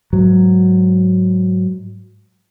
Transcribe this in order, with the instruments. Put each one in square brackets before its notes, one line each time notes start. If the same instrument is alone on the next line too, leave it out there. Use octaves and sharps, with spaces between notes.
[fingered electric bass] G#2 F#3